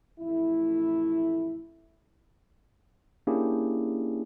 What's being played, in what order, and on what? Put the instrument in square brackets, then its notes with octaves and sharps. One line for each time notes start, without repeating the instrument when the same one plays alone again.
[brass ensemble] A1 F2 A3 E4
[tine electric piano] A#3 C#4 D4 E4 G4 G#4